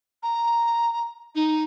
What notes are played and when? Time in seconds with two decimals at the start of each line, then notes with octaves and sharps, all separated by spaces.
0.23 A#5
1.35 D#4